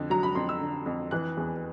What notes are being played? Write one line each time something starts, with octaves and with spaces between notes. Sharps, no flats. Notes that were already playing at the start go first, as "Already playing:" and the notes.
Already playing: F2 D3
F#3 A#5
B5
F2 C6
E6
D3
F2
E3 F#6
E2